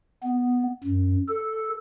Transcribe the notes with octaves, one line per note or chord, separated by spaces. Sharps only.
B3
F#2
A4